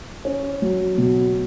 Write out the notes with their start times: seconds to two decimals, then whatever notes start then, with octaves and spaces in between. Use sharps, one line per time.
0.25 C#4
0.62 F#3
0.98 B2